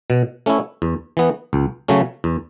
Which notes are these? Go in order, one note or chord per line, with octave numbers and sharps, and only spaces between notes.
B2
A3 C#4 E4
E2
E3 B3
C#2
C#3 F#3 A3 C#4
E2